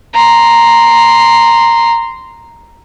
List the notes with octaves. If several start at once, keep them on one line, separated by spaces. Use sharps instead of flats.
A#5 C6